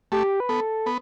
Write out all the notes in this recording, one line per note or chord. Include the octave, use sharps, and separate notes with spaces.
A3 G4
B4
B3 A4
B3